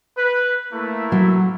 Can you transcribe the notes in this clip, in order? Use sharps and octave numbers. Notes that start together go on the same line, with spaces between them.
B4
A3 A#3 E4
F#3